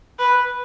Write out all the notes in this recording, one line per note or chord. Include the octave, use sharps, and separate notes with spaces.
B4